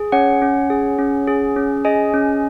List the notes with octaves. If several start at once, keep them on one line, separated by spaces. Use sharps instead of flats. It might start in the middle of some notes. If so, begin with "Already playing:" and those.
Already playing: G#4
C#4 C#5 F#5
C#4
G#4
C#4
G#4
C#4
G#4 D#5 G#5
C#4